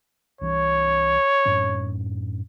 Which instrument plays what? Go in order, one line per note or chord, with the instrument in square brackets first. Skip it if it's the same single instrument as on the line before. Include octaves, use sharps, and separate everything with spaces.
[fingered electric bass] C2 E3 [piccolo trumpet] C#5
[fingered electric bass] F#2 A2 C#4